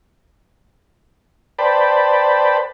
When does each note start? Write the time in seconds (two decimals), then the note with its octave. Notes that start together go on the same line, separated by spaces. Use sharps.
1.59 B4 C5 D5 G5 A5 B5